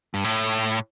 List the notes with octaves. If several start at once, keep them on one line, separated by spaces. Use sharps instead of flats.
G2
A2